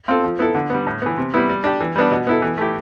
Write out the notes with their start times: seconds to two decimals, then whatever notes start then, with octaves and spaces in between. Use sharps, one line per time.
0.08 C4 F4 A4
0.24 F3
0.39 B3 E4 A4
0.55 D3
0.70 G3 B3
0.87 A2
1.02 E3 B3
1.18 C3
1.34 G3 B3 E4
1.49 G3
1.64 D4 G4
1.81 E3
1.96 G3 B3 D4
2.12 B2
2.27 B3 E4 A4
2.42 E3
2.58 A3 E4 G4